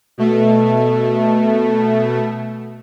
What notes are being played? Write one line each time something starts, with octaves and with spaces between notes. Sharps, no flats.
B2 A3